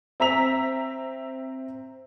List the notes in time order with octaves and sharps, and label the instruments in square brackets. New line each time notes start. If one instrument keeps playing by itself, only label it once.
[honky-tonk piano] C4 E5 A#5 E6 B6 F7